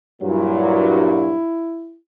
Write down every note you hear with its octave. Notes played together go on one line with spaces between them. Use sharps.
G2 A#2 F#3 E4